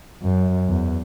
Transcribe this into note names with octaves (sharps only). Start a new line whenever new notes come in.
F#2
E2